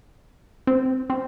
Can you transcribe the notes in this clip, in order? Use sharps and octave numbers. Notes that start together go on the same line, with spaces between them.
C4
C4